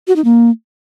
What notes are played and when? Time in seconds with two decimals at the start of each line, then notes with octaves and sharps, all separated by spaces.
0.07 F#4
0.16 D#4
0.24 A#3